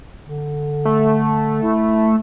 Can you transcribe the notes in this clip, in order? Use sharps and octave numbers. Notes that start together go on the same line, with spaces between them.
D3
A3
E4